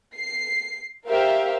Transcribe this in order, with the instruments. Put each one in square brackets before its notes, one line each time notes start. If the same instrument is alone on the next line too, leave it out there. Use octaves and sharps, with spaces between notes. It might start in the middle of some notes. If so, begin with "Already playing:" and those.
[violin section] C7
G4 A#4 C5 E5 F5